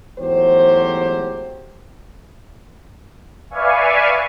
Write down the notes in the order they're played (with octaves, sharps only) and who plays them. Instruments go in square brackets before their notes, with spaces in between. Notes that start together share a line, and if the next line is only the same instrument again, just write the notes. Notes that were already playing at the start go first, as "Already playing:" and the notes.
[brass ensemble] E2 G#2 F#3 A3 G4 C5
[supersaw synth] B4 D5 E5 F5 G#5 C#6